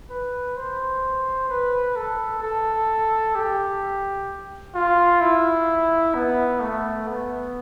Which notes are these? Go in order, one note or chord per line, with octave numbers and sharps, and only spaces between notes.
B4
C5
B4
A4
A4
G4
F4
E4
B3
A3
B3